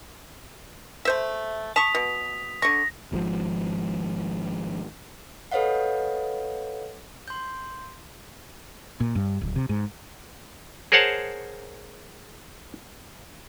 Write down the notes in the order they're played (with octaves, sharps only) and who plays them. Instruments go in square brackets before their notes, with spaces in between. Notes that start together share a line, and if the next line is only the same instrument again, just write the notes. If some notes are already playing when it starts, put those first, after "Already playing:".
[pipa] A3 C5 E5
[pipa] A5 C#6 [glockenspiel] D#6 B6 F7
[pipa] B2
[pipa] D3 C#6 [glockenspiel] A#6
[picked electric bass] G#1 G#2 C3 F3
[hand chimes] A4 B4 C#5 D#5 F5 F#5
C6 G6
[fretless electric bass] A#2
G2
D1
C3
G#2
[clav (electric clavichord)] G#4 A#4 C5 C#5 F#5 A5